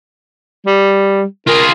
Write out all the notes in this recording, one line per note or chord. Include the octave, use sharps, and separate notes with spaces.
G3
F4 G#4 A#4